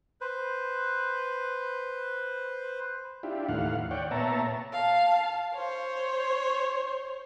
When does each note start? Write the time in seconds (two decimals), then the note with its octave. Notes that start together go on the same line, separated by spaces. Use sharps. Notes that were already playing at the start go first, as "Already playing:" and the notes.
0.21 B4 C5
3.23 D4 E4 F4 G4
3.48 D#2 A2 E3 F5 F#5
3.91 C#5 D5 F#5 G5
4.11 A#2 B3 C#5 E5 A5 A#5
4.72 F5 A5
5.54 C5 C#5